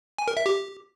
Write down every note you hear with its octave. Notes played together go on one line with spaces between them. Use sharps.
G#5
A#4
E5
G4